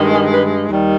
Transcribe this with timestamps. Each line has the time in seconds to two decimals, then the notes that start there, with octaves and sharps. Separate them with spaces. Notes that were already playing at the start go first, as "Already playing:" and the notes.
Already playing: G2 D#3 G#3
0.13 G#4
0.31 B4
0.69 D#2 D#3 G3